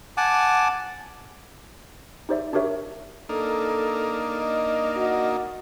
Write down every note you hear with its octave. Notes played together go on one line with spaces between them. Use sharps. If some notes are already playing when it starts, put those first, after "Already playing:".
F#5 G#5 A5 D6
D#4 G4 C5 D5 E5
D4 F#4 G4 A#4 C#5 E5
A#3 D4 D#4 A4
D#5
F#4